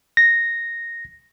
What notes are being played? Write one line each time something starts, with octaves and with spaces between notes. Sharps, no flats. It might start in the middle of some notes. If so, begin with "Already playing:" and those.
A#6